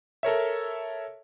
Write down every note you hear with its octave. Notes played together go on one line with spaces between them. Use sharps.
A4 A#4 C#5 E5